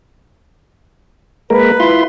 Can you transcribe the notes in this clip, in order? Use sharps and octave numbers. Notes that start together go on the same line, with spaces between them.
G#3 A#3 A#4 B4
E4 F4 C6